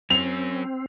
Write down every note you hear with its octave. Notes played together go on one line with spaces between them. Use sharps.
F#3 C4 C#4 F7